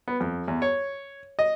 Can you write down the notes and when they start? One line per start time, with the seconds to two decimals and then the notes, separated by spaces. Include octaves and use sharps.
0.08 B3
0.20 F2
0.48 E2
0.62 C#5
1.39 D#5